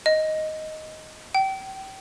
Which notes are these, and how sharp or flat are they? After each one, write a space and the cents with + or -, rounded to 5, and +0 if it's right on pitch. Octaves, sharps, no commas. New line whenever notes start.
D#5 +5
G5 -30